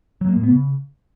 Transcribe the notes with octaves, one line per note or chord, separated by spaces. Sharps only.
F#3
A#3
A2
B3
C#3